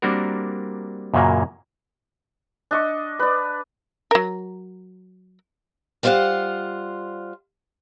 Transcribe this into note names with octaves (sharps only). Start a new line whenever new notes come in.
G3 A#3 C4 D4 F#4 A#4
F#2 A#2 C#3 F#3 A#3
D4 D#5 C#6
B4 D5
F#3 A#4
G3 F4 C5 C#5 F5 F#5